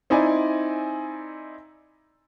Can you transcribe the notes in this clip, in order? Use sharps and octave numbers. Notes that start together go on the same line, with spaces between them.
C4 D#4 E4 D5 G#5